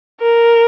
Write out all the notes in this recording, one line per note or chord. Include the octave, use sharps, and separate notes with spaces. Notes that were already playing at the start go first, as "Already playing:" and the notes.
A#4